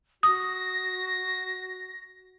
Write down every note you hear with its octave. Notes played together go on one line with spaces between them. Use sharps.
F#4 D#6 A#6